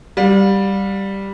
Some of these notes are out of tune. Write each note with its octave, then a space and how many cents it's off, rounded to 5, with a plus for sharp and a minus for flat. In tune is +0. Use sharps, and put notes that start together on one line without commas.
G3 +0 F5 +45